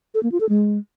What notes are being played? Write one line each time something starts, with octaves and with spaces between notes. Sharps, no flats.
A4
A#3
F4
A4
G#3